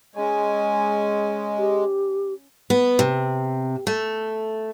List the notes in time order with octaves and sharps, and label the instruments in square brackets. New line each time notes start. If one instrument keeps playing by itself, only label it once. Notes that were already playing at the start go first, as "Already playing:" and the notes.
[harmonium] G#3 [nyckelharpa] C#4 G#5
[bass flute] G4
[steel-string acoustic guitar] B3
C3
A3